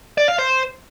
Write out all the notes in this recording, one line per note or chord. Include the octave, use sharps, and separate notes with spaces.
D5
F5
C5